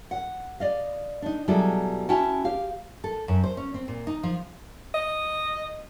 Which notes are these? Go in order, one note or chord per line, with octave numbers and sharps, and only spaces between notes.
F#5
D5 D#5 F5
D4 D#4
B2 F#3 G3 E4 G#4 A4
C#4 E4 F#4 G5 A5
G4 F5
A4
F#2
C5
C#4
C4
A#2
D#4
F3
D#5